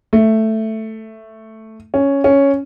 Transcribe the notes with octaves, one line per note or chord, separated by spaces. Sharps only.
A3
C#4
C#4